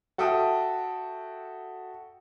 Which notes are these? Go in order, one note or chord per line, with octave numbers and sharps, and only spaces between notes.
F#4 A4 E5 G5 D#6